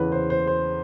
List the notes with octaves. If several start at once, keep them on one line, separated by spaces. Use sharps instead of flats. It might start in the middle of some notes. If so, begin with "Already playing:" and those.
Already playing: E2 C#3 E3 B4
C5
C5
C5